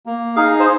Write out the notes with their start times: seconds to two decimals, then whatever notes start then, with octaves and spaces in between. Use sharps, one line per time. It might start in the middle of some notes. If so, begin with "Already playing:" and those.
0.06 A#3
0.36 D#4 G#4 F5
0.60 C5